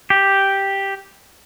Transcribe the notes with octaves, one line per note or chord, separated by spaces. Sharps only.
G4